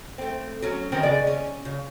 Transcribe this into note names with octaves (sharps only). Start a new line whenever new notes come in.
A3 C4
F#3 C#4
D#3 C4 C#4
C#3 G#3 D5
C#4
C#3